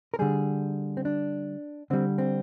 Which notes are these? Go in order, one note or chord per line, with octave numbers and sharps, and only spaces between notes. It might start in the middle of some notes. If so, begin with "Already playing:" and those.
A#4
D3 G3 G#4
C4
D4
D3 G3 C4
C4